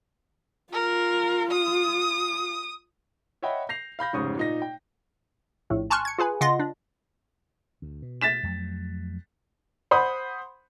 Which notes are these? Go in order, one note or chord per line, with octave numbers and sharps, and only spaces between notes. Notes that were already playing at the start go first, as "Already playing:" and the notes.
F4 A#4
D#6
C#5 D#5 E5 F#5 G5 B5
G6 A#6 C7 F7
F5 B5 G6 A#6
F1 G#2 C#3 C#6 D#6
A#2 D#4 A#6
G5
A#1 A2
G#5 A5 C6 C#6 F6 F#6
G#6 C#7
F4 G#4 B4 G#5
C#3 F4 D#5 F#5 C6 A#6
D4
D2
B2
A6 B6 E7
F2 F#3 A3
C5 F#5 B5 C6 D#6